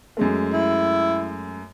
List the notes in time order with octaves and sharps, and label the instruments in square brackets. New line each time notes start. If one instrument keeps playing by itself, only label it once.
[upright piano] F#2 G#3 A3
[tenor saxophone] E4